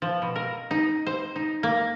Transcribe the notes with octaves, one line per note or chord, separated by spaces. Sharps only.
F3
B2
A#4
D#4
C5
D#4
A#3